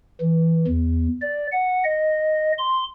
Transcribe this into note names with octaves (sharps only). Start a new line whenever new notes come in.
E3
E2
D5
F#5
D#5
C6